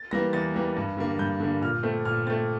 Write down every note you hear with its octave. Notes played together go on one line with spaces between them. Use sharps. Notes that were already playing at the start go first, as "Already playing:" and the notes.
Already playing: A6
E3 G3 A#3 A#6
E2 A6
E3 G3 A#3
G2
D3 G3 A#3
G2 G6
D3 G3 A#3
A#2 F6
A3 C4
A#2 F6
A3 C4 A6